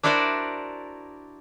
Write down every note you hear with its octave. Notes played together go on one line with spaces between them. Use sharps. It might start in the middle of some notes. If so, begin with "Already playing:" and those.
D4 E4 F#4 A#4 C5 D5